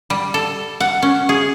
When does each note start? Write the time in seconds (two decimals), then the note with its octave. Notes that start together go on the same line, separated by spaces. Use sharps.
0.10 G3
0.34 A4
0.80 F#5
1.02 C#4
1.29 G#4